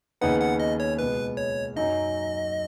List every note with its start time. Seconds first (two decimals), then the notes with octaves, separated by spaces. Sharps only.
0.21 D#2 C#3 B3 D#4 B4 F#5
0.41 F#5
0.60 D#5
0.80 C#5
0.99 C#2 B2 B3 B4
1.37 C#5
1.76 F#2 F#3 D#4 D#5